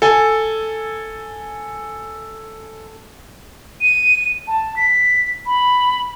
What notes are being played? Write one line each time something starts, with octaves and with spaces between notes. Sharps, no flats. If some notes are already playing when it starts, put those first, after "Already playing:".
A4 G#5
D#7
A5
B6
B5